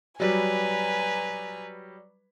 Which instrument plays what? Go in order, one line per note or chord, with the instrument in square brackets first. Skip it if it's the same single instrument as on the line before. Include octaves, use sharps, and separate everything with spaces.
[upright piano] F#3 G3 [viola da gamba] B4 [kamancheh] G#5 A#5